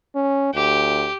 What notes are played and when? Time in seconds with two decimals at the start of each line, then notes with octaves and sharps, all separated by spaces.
0.15 C#4
0.54 D2 G4